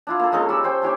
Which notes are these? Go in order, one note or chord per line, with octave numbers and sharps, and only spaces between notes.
D4 E4 F4
A#3 A4
G#3 C#4 D#4 A4
G3 D5 E6
C#4 C5 G5
D4 E4 G4 C#5